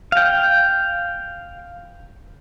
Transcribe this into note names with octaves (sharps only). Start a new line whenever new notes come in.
F5 G5